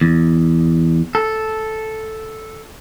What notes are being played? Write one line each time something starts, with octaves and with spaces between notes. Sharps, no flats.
E2
A4